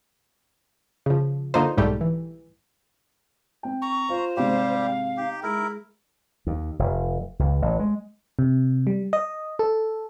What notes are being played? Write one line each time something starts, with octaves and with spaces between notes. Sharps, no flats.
C#3 F3
D3 A#3 D#4 F4 C5
B1 G#2 G3 A3 G4
E3
C4 G5
A#5 C#6
F4 C5
G#2 C3 G3 G4 F5
D#4 G4
G#3 E4 A#4
D#2
F1
C#2
A1
G#3
C3
G3
D#5
A4